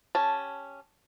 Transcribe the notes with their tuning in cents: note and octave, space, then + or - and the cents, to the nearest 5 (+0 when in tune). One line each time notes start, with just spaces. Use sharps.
C#4 +0 G4 +0 A5 -5